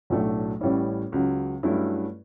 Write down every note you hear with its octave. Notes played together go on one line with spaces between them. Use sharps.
B1 A2 F#3 A3 D4
A1 A2 G3 C#4 E4
C#2 C#3 F#3
G2 F#3 A3 C#4 E4